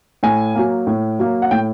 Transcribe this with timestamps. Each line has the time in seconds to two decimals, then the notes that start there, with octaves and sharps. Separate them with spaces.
0.23 A2 G#5
0.55 F#3 A#3
0.87 A2
1.19 F#3 A#3
1.42 F#5
1.51 A2 G5